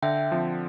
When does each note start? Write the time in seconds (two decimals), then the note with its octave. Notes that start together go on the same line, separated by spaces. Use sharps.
0.02 D3 E5 G5
0.32 F3 C4